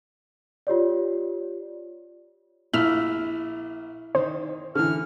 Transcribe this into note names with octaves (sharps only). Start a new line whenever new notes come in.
F4 G4 C#5 D5
A#1 E4 F6
D#3 D#4 C5
D3 E3 F6